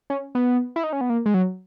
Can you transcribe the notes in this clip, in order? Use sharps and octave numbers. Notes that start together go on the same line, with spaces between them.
C#4
B3
E4
D#4
C#4
B3
A#3
G#3
F#3